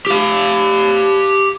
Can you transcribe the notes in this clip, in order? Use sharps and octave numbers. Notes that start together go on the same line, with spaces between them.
G4 F5